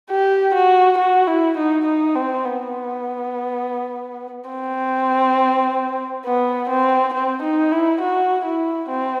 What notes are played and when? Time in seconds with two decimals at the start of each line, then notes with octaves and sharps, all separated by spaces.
0.11 G4
0.55 F#4
0.98 F#4
1.28 E4
1.58 D#4
1.86 D#4
2.15 C4
2.45 B3
4.50 C4
6.26 B3
6.70 C4
7.14 C4
7.42 D#4
7.72 E4
8.01 F#4
8.45 E4
8.90 C4